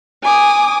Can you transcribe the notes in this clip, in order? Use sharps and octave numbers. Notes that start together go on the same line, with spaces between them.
G#5 D6 D#6